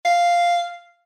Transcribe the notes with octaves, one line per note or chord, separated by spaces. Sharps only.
F5